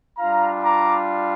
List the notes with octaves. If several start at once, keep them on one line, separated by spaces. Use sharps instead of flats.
G3 D4 F4 F5 A#5
A#5 D6